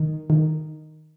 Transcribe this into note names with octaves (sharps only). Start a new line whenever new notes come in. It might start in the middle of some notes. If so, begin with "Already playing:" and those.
Already playing: D#3
D#3